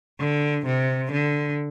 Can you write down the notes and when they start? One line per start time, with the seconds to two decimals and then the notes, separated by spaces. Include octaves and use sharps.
0.20 D3
0.66 C3
1.11 D3